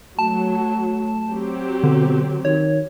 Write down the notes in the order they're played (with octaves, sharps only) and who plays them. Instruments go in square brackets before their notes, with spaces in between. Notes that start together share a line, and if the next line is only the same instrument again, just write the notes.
[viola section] F#3 [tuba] A3 [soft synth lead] A5
[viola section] F#3 C4 G4
[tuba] B2 [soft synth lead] D3
[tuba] D#3 [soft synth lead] C#5